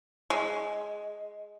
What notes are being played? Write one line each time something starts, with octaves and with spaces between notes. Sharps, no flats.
G#3